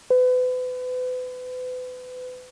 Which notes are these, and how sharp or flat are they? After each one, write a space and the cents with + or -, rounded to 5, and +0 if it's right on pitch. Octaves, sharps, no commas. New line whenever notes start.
B4 +35